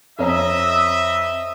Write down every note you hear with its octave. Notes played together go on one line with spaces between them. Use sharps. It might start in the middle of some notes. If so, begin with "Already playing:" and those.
F2 C#5 D#5 E5 A#5